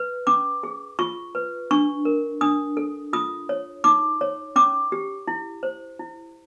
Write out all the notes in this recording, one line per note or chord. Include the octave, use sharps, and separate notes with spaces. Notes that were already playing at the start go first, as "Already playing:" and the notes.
Already playing: B4
C#4 D6
G#4
F4 C#6
B4
D4 C#6
A#4
D4 D#6
A4
F4 D#6
C#5
D#4 D6
C#5
C#4 D6
G4
E4
C5
E4